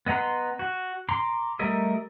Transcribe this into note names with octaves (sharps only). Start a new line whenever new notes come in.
B3 D#5 F#5 A#5 C6
F#4
A#5 C6 D6
G3 A3 A#4 D#5 E5